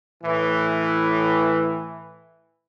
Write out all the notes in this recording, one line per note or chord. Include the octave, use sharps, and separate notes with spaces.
A2 E3